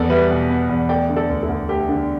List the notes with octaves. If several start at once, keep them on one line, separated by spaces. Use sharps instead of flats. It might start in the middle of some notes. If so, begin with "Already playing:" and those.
Already playing: E2 B3 A4 D5
G3 B4 E5
B2
B3
E2
A3 D5 G5
D3
A4 D5
D2
E4 A4
D2
A3 G4
D3